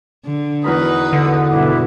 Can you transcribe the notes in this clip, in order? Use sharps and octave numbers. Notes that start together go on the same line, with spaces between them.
D3
E2 D#4 F#4 A#4 B4 B5 D#6
D3
G2 B2 E4 F#4 D6